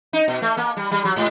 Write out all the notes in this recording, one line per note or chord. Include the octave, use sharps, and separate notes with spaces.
D#4
B2
A3
A#3
G3
G3
F#3
G#2